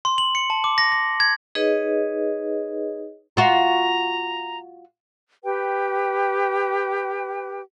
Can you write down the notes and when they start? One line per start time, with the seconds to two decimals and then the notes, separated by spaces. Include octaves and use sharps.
0.05 C6
0.18 F#7
0.35 C#7
0.50 A5
0.64 D6
0.78 A#6
0.92 A#6
1.20 G#6
1.55 D#4 G#4 B4 C#5 D#5
3.37 F4 F#4 A#5
5.44 G4 B4 G5